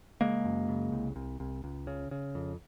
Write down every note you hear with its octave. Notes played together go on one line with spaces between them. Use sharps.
C#3 G#3 A#3
F#2
C#3
C2
C2
C2
C#2
C#3
C#3
F2